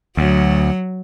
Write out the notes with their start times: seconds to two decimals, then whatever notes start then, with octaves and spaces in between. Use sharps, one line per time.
0.17 D2 F#3